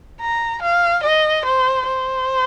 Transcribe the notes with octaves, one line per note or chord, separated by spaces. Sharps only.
A#5
F5
D#5
C5
C5